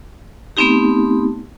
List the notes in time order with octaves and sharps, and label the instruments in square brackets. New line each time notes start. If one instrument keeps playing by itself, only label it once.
[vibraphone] A3 B3 C4 D#4 G4